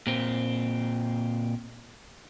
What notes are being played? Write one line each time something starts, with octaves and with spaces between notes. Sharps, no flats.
A#2 C4